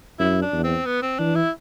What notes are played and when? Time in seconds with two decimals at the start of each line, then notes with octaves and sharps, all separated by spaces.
0.20 F#2 E4
0.42 D4
0.53 E2
0.64 C4
0.86 B3
1.02 C4
1.19 E3 D4
1.35 E4